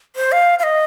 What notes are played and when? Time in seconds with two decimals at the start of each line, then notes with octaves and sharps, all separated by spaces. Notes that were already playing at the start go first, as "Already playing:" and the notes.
0.16 C5
0.32 F5
0.59 F5
0.63 D#5